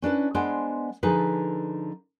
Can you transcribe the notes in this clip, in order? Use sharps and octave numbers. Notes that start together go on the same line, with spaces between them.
C#4 D4 E4 B4
G#3 B3 D4 C5 F#5 G#5
D3 F3 D#4 G#4 A4 B4